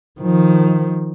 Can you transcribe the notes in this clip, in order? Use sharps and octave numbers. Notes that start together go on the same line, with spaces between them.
D#3 F3